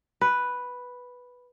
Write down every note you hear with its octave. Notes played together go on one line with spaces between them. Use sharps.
B4